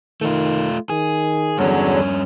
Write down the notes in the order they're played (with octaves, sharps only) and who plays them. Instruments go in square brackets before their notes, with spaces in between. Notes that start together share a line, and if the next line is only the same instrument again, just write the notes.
[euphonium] D#3 [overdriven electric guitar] A3 F4
[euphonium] D#3 [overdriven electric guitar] G#4
[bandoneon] E2 D3 F#3 [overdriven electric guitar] G2 C#4